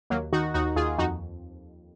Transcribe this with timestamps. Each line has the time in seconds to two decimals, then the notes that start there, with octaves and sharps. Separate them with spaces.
0.10 D#2 F#3 A#3
0.33 D#3 D#4 F#4
0.54 D#2 D#4 F#4
0.76 D#2 F4 G#4
0.98 F2 D#4 F#4